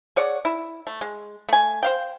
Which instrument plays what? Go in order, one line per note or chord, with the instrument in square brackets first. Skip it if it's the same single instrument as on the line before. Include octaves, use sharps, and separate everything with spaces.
[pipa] G#4 C#5 D5 F#5
E4
A3
G#3
A3 G#5
C5 F5 G5